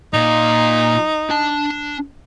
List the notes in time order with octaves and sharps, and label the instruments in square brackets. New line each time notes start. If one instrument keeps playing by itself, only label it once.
[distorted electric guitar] A#2 [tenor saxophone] D#4
[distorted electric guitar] D4 A5